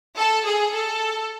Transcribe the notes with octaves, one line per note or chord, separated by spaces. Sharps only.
A4
G#4
A4